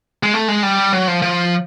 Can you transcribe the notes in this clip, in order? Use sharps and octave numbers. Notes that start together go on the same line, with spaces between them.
G#3
A3
G#3
G3
F#3
F3
F3